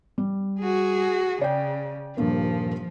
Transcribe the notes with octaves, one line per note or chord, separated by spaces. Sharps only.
G3
F#4 G#4
C#3 D5 G5
D#1 G2 F3 A#3